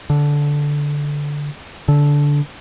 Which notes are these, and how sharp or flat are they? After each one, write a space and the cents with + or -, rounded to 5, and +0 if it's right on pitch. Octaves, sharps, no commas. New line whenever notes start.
D3 -10
D3 -15